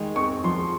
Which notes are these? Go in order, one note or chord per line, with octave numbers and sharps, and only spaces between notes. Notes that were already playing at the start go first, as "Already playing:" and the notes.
Already playing: D#3 G#3
C4 C#6
F3 C6